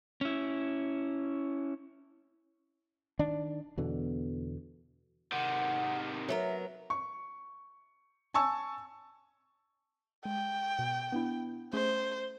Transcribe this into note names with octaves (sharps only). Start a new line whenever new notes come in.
C#4 E4
D#3 D4
E2 B2 D3
C3 D#3 F#5
F#3 B3 A#4 E5
C#6
G#5 A5 C#6 E6
G#3 G5
B2
B3 D4 E4
A3 C#4 G#4 C5